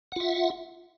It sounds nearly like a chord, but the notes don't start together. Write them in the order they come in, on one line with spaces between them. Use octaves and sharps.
F#5 F4 E5